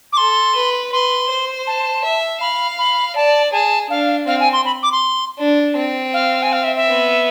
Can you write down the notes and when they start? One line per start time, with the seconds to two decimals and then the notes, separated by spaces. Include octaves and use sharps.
0.13 D6
0.17 A4 C6
0.55 B4
0.92 B4 C6
1.30 C5
1.67 A5
2.04 E5
2.41 F5 B5
2.79 B5
3.16 D5 A5
3.53 G#4 A5
3.90 D4 F5
4.27 C4 F5
4.40 G#5
4.53 C6
4.65 B5
4.83 D6
4.92 C6
5.39 D4
5.77 C4
6.13 F5
6.42 G#5
6.53 F5
6.64 E5
6.76 E5
6.88 B3